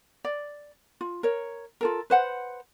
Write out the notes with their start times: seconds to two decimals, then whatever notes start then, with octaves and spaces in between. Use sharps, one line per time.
0.25 D5
1.01 F4
1.23 A#4 C#5
1.81 F4 A4 A#4
2.10 B4 C5 F#5